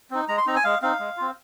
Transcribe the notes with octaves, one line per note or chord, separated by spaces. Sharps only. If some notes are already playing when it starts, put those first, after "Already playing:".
C4 D#4
G#3 A#5
C6
C4 D#4 A#5
G#5
G#3 F5
C4 D#4 F5
G#3
C4 F4